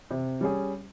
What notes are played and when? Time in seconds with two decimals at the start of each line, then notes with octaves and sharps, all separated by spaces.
0.11 C3
0.41 G3 C#4 G#4